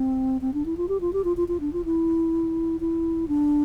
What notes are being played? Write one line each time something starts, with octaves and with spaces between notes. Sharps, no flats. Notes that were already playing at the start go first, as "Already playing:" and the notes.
Already playing: C4
C4
D4
E4
F4
G4
F4
G4
F4
F4
F4
D4
F4
E4
E4
D4